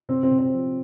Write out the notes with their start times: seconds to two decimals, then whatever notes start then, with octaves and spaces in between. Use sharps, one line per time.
0.09 C3 C4
0.23 C4
0.31 C3
0.39 C4
0.53 F3